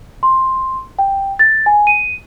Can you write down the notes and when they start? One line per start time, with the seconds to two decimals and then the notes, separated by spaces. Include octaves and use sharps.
0.23 C6
0.99 G5
1.39 A6
1.66 G#5
1.87 D#7